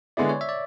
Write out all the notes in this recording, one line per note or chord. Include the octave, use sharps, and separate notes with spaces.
D3 G#3 B3 E4 G#4 D5
C#5
E5
D5